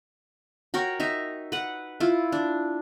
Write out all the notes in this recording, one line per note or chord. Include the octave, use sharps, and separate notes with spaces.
F#4 A#4 C#5 G5
D#4 E5 A#5
B4 F#5
E4 F4
D4